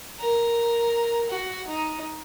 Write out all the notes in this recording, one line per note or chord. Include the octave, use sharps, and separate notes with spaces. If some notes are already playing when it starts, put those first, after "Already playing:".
A#4
F#4
D#4